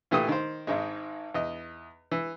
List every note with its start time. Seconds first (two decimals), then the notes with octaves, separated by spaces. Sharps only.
0.11 A#2 E3 A3 G4 D#6
0.29 D#3 C5
0.67 G#1 G#2 G#3
1.34 E2 D#5
2.12 E3